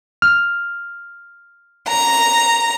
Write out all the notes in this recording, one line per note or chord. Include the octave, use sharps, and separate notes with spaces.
F6
A#5